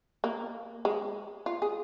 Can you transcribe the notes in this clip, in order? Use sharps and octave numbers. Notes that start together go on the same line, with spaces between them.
A#3
G#3
F4
G#4